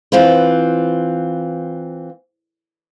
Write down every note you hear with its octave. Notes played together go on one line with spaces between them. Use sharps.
E3 C4 F4 B4